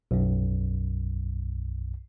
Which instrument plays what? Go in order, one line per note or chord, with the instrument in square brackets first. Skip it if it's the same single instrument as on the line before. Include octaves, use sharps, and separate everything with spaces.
[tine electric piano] B1 F#2